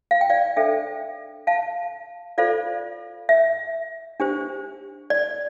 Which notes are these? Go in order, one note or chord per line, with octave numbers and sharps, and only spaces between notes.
F5
G5
D5 F5
D4 A4 C5 E5 G5
F5 A5
F4 A4 C5 D5 F5
E5
D4 G4 C5
D5